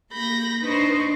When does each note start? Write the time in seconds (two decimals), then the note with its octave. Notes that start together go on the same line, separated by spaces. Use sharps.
0.12 A#3 B5 G6 A#6
0.61 D4 D#4 B4 C5 D#5 C#6